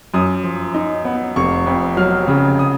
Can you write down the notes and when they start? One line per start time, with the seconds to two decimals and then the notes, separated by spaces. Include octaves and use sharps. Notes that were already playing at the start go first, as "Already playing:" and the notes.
0.14 F#2 D#6
0.44 F3
0.74 D#4
1.05 B3
1.36 F1 C#6
1.66 F2
1.97 F#3 F6
2.28 C#3
2.59 D#6